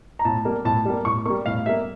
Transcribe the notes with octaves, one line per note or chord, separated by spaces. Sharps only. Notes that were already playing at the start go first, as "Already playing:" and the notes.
A#5
A2 A5
G3 A#3
A2 A5
G3 A#3
A2 C#6
G3 A#3 C#6
A2 F5
G3 A#3 E5